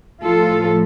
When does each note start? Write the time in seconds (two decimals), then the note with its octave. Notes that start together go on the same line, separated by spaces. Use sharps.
0.23 A2 F3 F4 A4